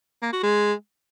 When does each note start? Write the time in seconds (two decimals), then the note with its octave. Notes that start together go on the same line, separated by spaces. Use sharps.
0.22 A#3
0.33 F#4
0.43 G#3